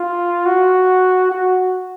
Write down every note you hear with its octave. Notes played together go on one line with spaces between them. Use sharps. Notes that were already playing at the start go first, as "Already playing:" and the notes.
Already playing: F4
F#4
F#4